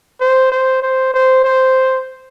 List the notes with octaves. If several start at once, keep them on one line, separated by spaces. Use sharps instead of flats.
C5
C5
C5
C5
C5